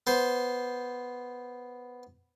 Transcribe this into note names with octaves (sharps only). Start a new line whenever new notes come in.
B3 C5